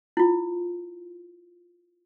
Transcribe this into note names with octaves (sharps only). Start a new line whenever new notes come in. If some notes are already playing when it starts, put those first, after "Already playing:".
E4 F4